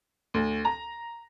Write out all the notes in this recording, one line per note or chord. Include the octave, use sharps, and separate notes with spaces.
D2
A#5